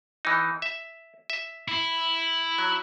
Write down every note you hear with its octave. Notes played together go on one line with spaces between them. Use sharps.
E3 D#4
E5
E5
E4
F#3